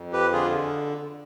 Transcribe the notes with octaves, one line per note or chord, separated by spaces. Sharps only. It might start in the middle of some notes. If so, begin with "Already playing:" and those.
Already playing: F2
G4 B4
D3 F4 G#4